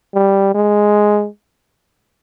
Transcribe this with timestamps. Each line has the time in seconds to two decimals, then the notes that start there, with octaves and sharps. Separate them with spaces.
0.14 G3
0.55 G#3